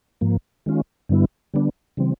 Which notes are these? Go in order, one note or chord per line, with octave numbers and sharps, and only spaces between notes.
G#2 F3 A#3
D#3 G#3 C#4 F4
G2 D3 G3 B3 E4
D3 G3 B3 D4
C#3 E3 G3 C4